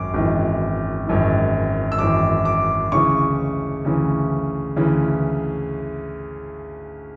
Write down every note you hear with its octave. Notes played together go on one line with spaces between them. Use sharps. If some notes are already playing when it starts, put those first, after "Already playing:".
Already playing: G#1 F#2 D6
G#1 F#2 E3
G#1 F#2 E3
E6
G#1 F#2 E3 D6
D6
D2 C#3 E3 C#6
D2 C#3 E3
D2 C#3 E3